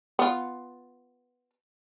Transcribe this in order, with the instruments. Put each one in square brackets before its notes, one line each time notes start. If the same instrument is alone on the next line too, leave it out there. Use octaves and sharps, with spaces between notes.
[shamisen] B3 F4